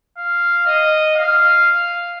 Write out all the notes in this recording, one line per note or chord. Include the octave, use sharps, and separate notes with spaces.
F5
D#5
F5